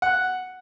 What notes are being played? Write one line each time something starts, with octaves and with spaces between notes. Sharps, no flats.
F#5